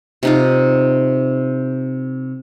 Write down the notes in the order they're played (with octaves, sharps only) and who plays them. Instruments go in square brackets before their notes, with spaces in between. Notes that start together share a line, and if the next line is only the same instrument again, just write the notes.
[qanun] C3 D#4 F4